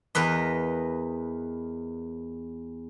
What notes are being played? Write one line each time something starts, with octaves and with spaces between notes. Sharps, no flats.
E2 A#4 B4 D#5